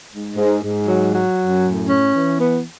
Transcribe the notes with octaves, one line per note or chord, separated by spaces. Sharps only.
G#2
G#2
G#2
F#3
F#3
F#2
A2
C#4
E3
B3